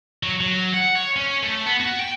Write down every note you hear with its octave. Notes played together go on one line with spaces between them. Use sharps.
F#3
F#3
F#5
C#5
C#4
A3
B3
F#4
G5